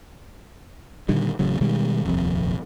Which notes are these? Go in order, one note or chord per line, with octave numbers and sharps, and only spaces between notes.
A#2 D3 D#3 G3
A1 C#3 F#3
B2 D#3 G3 G#3
D#1 A#1 F2 C3